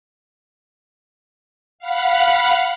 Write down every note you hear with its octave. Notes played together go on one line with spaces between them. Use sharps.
F5 F#5 B5